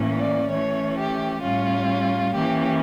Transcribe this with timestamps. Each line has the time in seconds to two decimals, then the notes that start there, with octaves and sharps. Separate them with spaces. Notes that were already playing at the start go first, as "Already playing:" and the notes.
Already playing: A2 E3 A#3 C#4
0.19 D5
0.50 E3 A3 C#4 C#5
0.96 G4
1.41 A2 G3 C#4 F4
2.34 E3 A#3 C#4 G4